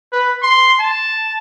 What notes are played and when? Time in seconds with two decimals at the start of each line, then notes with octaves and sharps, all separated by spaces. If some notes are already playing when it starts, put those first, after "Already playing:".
0.12 B4
0.42 C6
0.80 A5